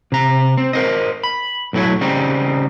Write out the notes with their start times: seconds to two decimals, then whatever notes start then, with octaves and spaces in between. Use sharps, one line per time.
0.12 C3 A#5
0.58 C4
0.73 A#4 C5 D#5
1.24 B5
1.73 B1 A2 F#3 E4 C#5
2.01 C#3 G3 C4 D#4